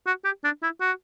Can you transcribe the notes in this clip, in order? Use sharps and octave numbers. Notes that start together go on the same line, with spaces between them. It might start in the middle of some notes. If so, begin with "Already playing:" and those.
F#4
G4
D4
E4
F#4